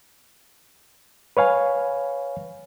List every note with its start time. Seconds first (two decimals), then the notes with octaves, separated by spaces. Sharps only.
1.37 B4 C#5 F5 G#5